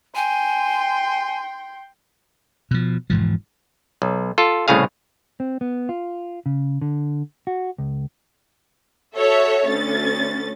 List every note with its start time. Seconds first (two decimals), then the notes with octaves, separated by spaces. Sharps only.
0.15 G5 G#5 C6
2.71 B2 F3
3.10 E1 G#2 E3 F3
4.02 B1
4.38 F4 A4
4.68 C2 A2 C#3 G#4 F5
5.40 C4
5.61 B3
5.89 F4
6.46 C#3
6.82 D3
7.47 F#4
7.78 C#2
9.15 F#4 A4 C#5 E5
9.67 D2 C#4 A6